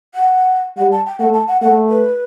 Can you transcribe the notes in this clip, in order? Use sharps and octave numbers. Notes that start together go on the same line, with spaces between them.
F#5
G3 F#5
A5
G5
A3 F#5
A5
F#5
A3 F#5
B4